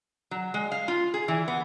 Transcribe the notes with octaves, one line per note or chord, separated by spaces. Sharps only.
F#3
G#3
F5
F4
G#4
E3
B3